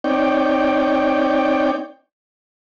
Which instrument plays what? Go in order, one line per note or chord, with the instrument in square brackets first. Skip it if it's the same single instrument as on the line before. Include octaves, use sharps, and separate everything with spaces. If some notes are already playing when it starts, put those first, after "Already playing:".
[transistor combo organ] C4 D#4 C#5 D5 G5